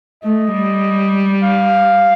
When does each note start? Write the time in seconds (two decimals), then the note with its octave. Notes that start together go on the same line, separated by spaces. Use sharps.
0.23 A3 D#5
0.53 G3
1.43 F5